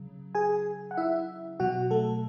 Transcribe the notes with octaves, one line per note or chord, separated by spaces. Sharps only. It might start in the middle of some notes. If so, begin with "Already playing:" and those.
Already playing: C#3 F#3
G#4 G#5
F#5
E4 E5
B2 F#3 F#4 F#5
A3 A4